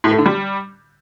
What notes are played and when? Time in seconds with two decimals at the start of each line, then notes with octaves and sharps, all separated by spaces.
0.04 A2
0.11 A3
0.18 D3
0.26 G3